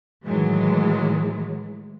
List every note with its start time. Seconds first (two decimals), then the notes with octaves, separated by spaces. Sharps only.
0.25 A2 D#3 E3 F#3 G#3